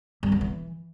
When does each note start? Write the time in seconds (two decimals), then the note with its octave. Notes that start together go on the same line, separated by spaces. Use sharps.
0.23 G3
0.32 B3
0.41 E3